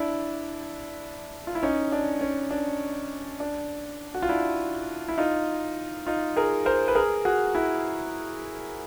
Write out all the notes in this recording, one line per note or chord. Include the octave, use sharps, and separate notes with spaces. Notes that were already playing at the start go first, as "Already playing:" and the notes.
Already playing: D4 E4
F4
E4
C#4 D#4
D4
C#4
D4
D4
F#4
F4
D4 E4
E4
D#4 F4
D#4 F4
G#4 A#4
A#4 C5
B4
G#4 A#4
F#4 G#4
E4 F#4